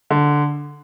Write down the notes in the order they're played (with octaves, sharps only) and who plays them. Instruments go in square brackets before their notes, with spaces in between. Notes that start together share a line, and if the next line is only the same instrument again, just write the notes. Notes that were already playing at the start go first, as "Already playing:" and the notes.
[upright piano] D3